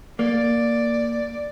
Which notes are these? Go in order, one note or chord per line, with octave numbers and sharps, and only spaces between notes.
A#3 D5